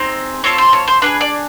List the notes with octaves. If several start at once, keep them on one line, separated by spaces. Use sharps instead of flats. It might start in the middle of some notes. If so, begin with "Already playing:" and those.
Already playing: C4 D#4 G#4
C4 F4 A4 C#5
C5
C#5
C5
D4 F4 G#4 B4
D5